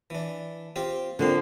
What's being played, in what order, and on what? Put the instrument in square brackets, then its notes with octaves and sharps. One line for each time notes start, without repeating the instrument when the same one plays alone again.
[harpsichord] E3 D4
C4 F4 G4
[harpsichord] A#2 A#3 C6 [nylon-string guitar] D3 F3 C4